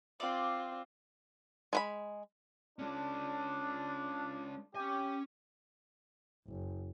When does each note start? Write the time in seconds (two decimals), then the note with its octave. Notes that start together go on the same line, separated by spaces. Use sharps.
0.20 C4 F4 D5
1.73 G#3 B4 B5
2.79 G#3 C#4 D4
4.75 C#4 G4 G#5
6.47 F#1